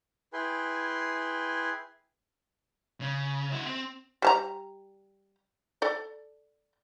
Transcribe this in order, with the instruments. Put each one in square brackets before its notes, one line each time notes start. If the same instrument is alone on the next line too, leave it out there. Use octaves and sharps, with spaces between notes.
[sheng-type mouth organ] E4 G#4 B4 G5 G#5 C6
[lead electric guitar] C#3
E4 F#4
C4
[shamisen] G3 A5 A#5
A4 D5